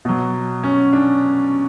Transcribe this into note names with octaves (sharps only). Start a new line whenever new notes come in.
B2 F#3
C#4
D4